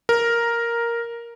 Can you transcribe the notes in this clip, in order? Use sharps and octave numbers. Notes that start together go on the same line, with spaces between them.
A#4